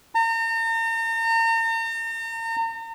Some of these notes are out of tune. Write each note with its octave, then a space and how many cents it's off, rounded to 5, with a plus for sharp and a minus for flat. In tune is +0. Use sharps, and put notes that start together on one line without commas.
A#5 -40